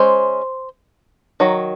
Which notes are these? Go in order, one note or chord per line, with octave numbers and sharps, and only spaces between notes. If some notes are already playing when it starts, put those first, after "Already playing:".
Already playing: G#3 C#4 C5
D#3 F#3